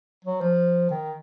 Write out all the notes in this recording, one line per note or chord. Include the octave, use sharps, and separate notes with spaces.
F#3
F3
D#3